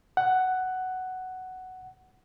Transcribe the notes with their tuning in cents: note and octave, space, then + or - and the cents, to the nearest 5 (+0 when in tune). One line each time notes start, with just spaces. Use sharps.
F#5 +5